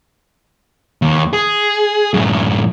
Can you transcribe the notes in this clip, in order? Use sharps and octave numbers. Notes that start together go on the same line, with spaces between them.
D#2
G#4
F#2 A2